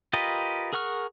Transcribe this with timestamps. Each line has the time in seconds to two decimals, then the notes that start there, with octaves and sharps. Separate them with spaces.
0.13 F4 G4 A#4 B4 D#5
0.73 G#4 A#4 F#5 C#6 F6